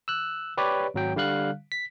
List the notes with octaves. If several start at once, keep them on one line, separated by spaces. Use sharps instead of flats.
E6 F#6
G4 B4 C#5 D5
G#1 F#3 G5
D3 G3 F5 F#6
B6